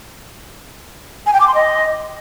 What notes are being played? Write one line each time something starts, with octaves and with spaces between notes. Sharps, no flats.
G#5
G5
D6
C6
D#5